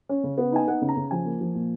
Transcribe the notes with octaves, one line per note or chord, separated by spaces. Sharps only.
C#4
C#3
B3
D#4 G#5
B3 F#5
C#3
A#5
C#3
F3 G#5
A#3
F3
A#2